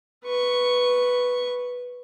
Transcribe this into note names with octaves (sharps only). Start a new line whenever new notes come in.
B4 C#6